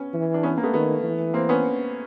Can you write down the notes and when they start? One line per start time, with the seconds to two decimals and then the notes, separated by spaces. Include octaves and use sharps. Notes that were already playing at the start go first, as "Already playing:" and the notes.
Already playing: B3 C#4
0.14 E3
0.34 D4
0.43 B3 C#4
0.58 A#3
0.63 A3 B3
0.73 D#3 A3 B3
1.04 E3
1.34 A#3 C4
1.49 B3 C#4